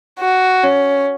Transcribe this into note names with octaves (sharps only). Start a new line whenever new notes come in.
F#4
C#4